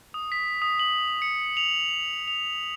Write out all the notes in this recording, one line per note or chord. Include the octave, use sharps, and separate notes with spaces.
D#6
B6
D#6
F#7
C#7
F7
F7